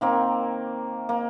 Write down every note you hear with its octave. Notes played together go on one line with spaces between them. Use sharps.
D#3 A#3 C4
A#3